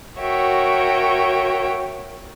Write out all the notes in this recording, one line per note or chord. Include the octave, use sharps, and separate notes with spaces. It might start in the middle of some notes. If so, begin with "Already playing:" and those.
F#4 A#4 C#5 E5 G5